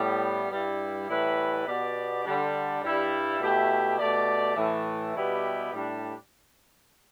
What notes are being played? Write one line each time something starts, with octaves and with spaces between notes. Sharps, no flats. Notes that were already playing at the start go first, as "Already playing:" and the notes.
Already playing: A2 G3 B3
G2 G3 E4
A2 E3 G3 E4 B4
B2 B3 G4 D5
D3 G3 D4
G2 G3 E4
B2 A3 E4 G4 E5
B2 A3 G4 D5
A2 E3 A3
B2 G3 B3 E4 G4
A2 G3 D4